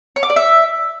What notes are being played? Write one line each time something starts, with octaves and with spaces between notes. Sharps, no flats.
C#5
D6
D5
E5